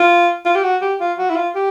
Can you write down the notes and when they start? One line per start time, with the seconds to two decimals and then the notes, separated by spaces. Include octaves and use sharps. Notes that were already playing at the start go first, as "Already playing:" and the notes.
Already playing: F4
0.45 F4
0.55 G4
0.63 F#4
0.81 G4
1.00 F4
1.18 F#4
1.29 E4
1.36 F4
1.55 G4